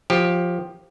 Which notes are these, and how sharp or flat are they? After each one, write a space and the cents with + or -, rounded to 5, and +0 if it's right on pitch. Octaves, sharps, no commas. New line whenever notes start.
F3 +10 G4 +0